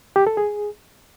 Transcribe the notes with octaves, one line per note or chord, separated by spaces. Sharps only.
G4
A4
G#4